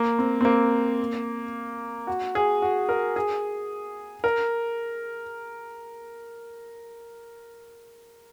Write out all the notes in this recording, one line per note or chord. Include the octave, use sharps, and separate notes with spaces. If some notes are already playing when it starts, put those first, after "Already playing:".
Already playing: A#3
C4
C4
A#3
F#4
G#4
F#4
A#4
G#4
A#4